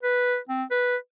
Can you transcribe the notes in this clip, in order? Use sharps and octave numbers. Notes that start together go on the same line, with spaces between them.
B4
C4
B4